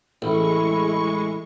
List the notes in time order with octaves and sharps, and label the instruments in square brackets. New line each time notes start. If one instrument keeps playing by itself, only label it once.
[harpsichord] A1 [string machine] G#3 C#6 [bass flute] E4